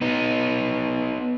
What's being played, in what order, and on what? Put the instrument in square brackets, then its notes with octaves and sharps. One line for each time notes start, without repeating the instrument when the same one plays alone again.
[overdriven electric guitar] B3 D#4